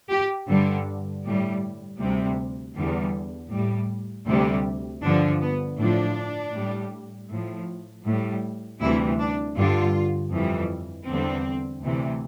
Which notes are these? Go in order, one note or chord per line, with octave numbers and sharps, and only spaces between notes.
G4
G2 D3 G3
A2 G3
D2 C3 G3
E2 D3 G3
A2 G3
D2 C3 G3
G2 D3 F3 D4
B3
A2 F3 D4
A2 G3
A2 F3
A2 G3
D2 C3 E3 G3 E4
D4
G2 D3 G3 F4
F2 E3 G3
E2 D3 G3 C4
D2 C3 E3